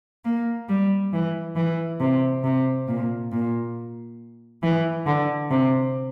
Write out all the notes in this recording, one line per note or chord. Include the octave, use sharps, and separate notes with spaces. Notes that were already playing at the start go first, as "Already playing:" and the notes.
A#3
G3
E3
E3
C3
C3
A#2
A#2
E3
D3
C3